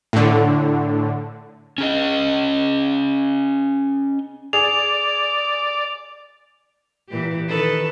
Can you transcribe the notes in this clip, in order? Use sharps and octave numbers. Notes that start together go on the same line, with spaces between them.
A2 D3
C#4 G#4 D#5
G#4 D5 F7
A#2 E3 G4
D#3 A4 B4